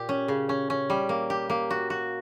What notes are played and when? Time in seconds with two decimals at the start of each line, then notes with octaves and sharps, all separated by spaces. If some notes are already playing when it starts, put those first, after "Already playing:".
Already playing: A#2 G4
0.09 C#4
0.28 C#3
0.49 C#4
0.70 C#4
0.90 G3
1.09 A#3
1.30 G4
1.50 A#3
1.70 F#4
1.90 F#4